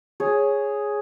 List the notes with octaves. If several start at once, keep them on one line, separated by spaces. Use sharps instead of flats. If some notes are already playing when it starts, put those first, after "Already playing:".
G#4 C#5